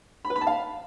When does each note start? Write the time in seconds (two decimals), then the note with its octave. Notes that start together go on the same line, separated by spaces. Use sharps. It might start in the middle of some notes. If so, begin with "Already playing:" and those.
0.25 B5
0.30 B4
0.36 B5
0.41 A5
0.47 F5